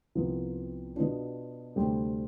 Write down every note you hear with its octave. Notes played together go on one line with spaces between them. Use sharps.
C2 C3 F3 B3 F4
B2 B3 D4 F4
D2 C3 G3 C4 G4